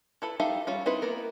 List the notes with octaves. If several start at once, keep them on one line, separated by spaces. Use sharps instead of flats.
E4 A4 B4
D#4 G4 A4 E5 F5
G3 C#4 F4
C4 D#4 E4 B4
A#3 B3 A#4